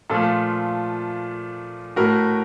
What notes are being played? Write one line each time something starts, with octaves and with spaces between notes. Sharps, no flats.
A#2 F3 A3 F4 A4
A2 A3 F#4 A#4